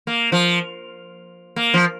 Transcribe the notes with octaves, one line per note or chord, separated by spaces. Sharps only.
A#3
F3
A#3
F3